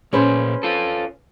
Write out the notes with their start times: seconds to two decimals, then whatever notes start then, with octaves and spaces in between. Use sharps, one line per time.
0.13 A#2 C#4 G#4 B4 C5
0.63 F4 A4